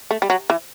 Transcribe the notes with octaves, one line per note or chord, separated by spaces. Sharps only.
A3
G3
F#3
E3